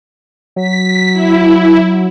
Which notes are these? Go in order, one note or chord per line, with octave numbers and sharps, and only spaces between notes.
F#3 B6
E4